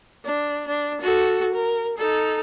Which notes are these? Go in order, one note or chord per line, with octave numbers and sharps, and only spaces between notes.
D4
D4
F#4 A4
A#4
D#4 A4